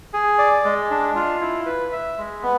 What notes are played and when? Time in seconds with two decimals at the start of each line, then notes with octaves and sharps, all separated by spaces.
0.13 G#4
0.38 D5
0.65 G#3
0.91 D4
1.15 F4
1.41 E4
1.66 B4
1.92 E5
2.18 G#3
2.43 B3